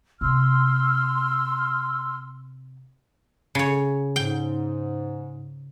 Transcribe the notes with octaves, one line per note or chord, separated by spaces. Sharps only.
C3 C6 E6 F6
C#3 C#5
G#2 G5